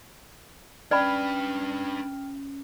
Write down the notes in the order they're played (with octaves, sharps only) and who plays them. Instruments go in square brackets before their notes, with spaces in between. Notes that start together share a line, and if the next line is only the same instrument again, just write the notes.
[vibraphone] C#4 [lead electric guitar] D4 B4 [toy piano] D5 B5 [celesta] G5 F6